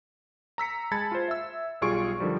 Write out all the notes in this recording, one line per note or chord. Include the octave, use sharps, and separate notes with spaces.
A#5 E6 B6 C#7
G#3 A5 B5 G#6 A6 C#7
F4 C5
E5 E6
B1 G3 F4 G#4 C#6 D7
D3 D#3 F3 G3